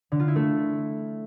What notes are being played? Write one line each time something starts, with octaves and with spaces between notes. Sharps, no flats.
D3
F4
E4
A3